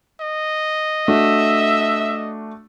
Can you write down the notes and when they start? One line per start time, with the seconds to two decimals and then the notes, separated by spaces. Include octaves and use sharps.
0.21 D#5
1.08 A3 D4 F#4 E5